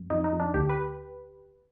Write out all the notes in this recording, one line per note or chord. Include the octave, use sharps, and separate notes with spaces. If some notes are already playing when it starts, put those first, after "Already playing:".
Already playing: F#2
F2 D#4
D#4
F2
D4
D2 G4
B4